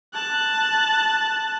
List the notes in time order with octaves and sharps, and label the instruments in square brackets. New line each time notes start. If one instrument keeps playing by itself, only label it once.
[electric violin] A5 F#6